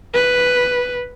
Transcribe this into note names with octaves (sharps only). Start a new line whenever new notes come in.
B4